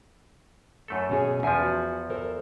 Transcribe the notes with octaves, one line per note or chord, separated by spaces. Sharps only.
F#2 A3 A4
B2 C#4 G#4
E2 F3 E5 G#5 A5
F#4
A4 A#4 C5